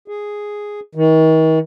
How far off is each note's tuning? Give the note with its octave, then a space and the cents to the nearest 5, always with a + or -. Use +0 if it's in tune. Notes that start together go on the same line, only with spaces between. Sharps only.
G#4 +0
D#3 +40